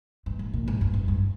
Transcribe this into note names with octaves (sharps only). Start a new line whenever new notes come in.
G2
G#2
A#2
G#2
G2
G2
G2